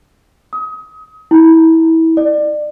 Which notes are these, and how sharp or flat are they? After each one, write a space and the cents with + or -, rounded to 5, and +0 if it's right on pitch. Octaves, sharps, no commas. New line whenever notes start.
D#6 +30
E4 -25
D5 +30